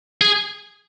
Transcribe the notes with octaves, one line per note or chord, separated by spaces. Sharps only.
G#4